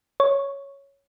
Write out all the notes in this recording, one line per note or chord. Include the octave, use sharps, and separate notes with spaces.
C#5